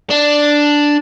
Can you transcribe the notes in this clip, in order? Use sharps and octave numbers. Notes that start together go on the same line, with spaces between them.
D4